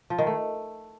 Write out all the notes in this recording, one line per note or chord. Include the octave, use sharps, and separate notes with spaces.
F3
D#3
A3